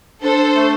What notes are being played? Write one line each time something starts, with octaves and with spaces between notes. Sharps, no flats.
D4 A4 C5
A3